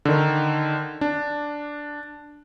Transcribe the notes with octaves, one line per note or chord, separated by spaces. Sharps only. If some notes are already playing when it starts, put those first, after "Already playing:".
D3 D#3
D4